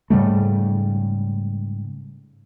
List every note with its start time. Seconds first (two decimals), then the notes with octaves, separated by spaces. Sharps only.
0.10 G#2 C#3 G3 A3